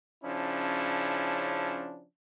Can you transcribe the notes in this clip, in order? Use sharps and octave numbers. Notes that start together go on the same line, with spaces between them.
C#3 F3 C#4 D4 E4